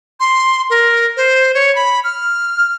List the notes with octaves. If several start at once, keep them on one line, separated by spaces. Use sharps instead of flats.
C6
A#4
C5
C#5
B5
F6